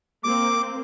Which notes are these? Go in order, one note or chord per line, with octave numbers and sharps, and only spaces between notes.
A#3 C4 D6